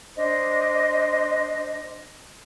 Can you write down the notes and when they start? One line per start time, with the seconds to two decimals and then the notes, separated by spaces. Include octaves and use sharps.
0.15 D4 C5 D#5